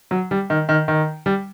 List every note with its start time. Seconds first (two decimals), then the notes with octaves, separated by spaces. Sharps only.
0.11 F#3
0.31 G3
0.50 D#3
0.69 D#3
0.88 D#3
1.26 G3